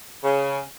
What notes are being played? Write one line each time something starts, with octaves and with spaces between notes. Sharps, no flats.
C#3